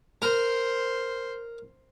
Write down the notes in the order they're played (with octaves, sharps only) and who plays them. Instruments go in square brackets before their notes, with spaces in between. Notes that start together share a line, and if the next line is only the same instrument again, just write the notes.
[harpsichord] A#4 [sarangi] C5